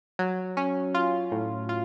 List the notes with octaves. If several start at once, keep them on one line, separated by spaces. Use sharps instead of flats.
F#3
C#4
F4
A2
F4